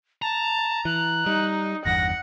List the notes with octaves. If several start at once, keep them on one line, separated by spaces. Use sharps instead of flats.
A5 A#5
E3 F#6
G3 D#4
G1 E2 G2 F#5 A#6